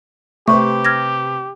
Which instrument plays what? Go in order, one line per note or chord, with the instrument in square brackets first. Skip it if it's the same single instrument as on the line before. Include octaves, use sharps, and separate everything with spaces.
[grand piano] C3 B4 C5 [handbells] A3 [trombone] G4 [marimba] C#6
[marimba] F6 G#6 A#6